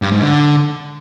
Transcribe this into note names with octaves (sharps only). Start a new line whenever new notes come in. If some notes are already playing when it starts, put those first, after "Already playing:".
G2
G#2
D3